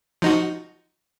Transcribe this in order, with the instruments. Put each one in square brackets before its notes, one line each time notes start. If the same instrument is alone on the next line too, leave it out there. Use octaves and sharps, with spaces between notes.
[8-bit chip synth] F3 D#4 F#4